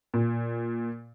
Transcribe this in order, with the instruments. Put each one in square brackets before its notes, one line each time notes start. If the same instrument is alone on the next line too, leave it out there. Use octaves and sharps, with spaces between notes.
[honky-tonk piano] A#2